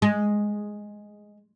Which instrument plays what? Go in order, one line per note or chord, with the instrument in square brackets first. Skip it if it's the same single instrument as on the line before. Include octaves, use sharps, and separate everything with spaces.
[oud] G#3